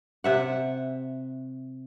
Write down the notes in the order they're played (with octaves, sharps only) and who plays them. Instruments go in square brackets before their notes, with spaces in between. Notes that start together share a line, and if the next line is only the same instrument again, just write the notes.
[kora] C3 E5 F#5